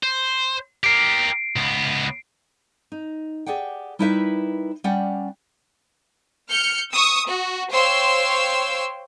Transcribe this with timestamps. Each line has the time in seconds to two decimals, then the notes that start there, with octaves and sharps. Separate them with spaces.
0.03 C5
0.84 G4 A#4 C7 D7
1.56 C#2 B3
2.92 D#4
3.46 G4 G#4 D5 F#5 G5
3.99 G3 D#4 E4 A#4 B4 E5
4.84 G3 C#4 D5 F#5 G5
6.50 F6 G6 C#7
6.91 C#6 D#6 E6
7.27 F#4
7.71 C5 C#5 F5 G5 C6 E6